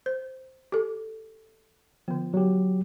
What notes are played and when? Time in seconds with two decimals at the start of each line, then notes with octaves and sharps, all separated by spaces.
0.06 C5
0.72 G4 A4
2.08 D3 F3 B3
2.34 F#3 G4